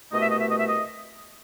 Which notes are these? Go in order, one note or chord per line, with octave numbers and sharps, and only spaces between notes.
C2 B2 A3 D#5
E5
D#5
E5
D#5
E5
D#5